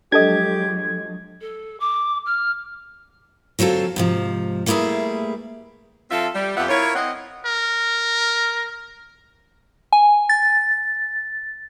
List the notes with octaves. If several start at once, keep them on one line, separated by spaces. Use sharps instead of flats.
F3 F#3 G#3 D4 G4 A4 D#5 G#6
A4
D6
F6
D3 F#3 C4 F4 A4
G#2 C3 F3
G3 A3 A#3 E4 G#4 B4
F3 C4 F4 A4 E5 F5
G3
F2 B3 F4 G4 E5 F#5
E4 F4 A#4 C#5
C4 D#5 F#5
A#4
G#5
A6